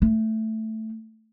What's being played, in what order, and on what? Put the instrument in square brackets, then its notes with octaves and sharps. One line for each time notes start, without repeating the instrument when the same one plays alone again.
[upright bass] A3